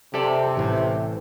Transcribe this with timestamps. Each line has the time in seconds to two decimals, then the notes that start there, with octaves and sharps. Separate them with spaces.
0.14 C3 G4 A4 D5
0.57 A1 A2